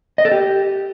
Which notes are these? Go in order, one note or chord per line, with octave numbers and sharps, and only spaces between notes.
D#5
A4
G4